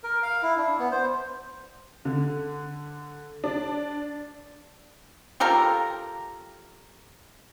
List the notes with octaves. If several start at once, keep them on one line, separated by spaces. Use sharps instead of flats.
A#4
F5
E4
D4
B3
C5
D3
D4
F4 G4 A4 A#4